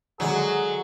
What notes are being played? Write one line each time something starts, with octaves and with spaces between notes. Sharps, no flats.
D3 F#3 G#3 G#4 F#5